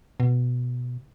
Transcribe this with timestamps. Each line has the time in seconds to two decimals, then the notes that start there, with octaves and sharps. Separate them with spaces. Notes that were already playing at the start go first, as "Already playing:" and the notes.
0.20 B2